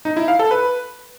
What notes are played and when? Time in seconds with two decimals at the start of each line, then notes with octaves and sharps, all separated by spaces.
0.05 D#4
0.17 E4
0.28 F5
0.39 A4
0.51 B4